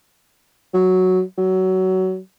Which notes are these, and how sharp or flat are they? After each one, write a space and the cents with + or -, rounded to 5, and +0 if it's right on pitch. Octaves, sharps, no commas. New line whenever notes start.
F#3 +0
F#3 +20